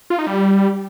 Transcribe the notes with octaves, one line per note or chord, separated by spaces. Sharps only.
F4
D#4
G3